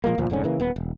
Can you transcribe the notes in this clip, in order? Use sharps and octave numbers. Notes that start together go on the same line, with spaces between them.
A#2 F3 G#3 A#3
D2 A#2 F3
F1 G#2 D3 C#4
C#3 E3 A#3
D#1 B3
E1